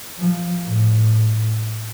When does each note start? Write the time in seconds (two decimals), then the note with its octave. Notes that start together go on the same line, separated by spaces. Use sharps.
0.19 F3
0.64 A2